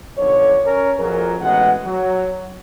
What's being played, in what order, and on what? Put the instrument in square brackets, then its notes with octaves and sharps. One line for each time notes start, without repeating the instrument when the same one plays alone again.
[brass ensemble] B1 F2 D3 C#5
C#4 A#4 C#5
F2 A#2 F#3 G#4 A#4
A1 B2 G#3 B3 F#5
F#3